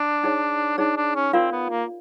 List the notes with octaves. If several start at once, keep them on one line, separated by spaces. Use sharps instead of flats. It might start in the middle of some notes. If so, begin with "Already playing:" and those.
Already playing: D4
D#4 G#4 C#5
D4 D#4 G#4 C#5
D4
C#4
C4 F4 A#4 D5 F5
B3
A#3